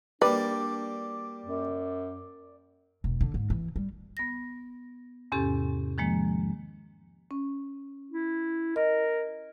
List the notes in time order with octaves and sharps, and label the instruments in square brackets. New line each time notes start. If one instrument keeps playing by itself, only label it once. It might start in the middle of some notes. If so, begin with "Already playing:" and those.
[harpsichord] G3 A#3 [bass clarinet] D4 [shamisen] B4 [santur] D5
[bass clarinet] F#2
[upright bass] E1
D3
G#2
E3
G3
[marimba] B3 A#6
E2 G#2 C3 C#4 G4 A4
D#3 F3 G#3 A#3
C#4
[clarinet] E4
[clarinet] A#4 [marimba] D#5